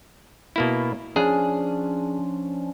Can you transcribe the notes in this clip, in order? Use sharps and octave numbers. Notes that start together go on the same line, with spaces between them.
B2 A#3 E4
F3 C#4 D4 G#4